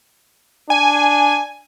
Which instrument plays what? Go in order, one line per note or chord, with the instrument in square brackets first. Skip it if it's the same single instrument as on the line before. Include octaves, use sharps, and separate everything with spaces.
[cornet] D4 [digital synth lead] G#5